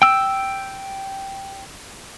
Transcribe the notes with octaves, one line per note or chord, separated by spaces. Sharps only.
G5 E6